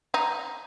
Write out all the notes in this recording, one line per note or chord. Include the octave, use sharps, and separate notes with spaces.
D#4